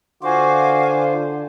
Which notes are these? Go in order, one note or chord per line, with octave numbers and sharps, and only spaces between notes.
D3 F4 F#4 C5 F5 G#5 D6